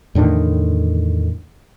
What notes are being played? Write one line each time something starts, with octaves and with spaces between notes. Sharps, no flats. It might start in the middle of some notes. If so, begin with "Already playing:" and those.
E2 A2 D3 D#3